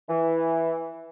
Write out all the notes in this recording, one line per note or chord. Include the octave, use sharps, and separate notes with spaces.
E3